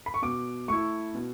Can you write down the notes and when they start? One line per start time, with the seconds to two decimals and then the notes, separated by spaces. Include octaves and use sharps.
0.06 B5
0.14 C#6
0.22 B2 D6
0.68 A3 E4 C#6
1.15 B2